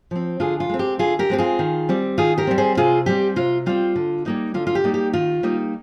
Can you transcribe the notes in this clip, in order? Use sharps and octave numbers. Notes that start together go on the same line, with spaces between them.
F3 C4
D3 F4 G#4
F4
G#3 C4
G4
D3 F4 G#4
G4 A#4
G#3 C4 G4
F4 G#4
D#3
G3 C4
D#3 F4 G#4
G4 A#4
G3 C4
G#4 C5
C3 F4 G#4
G3 C4 G4
C3 F4
G3 C4 F4
D3
G3 A#3 D#4
D3 F4
F4
G4
G3 A#3 D#4
G4
D#3 F4
G3 A#3 D#4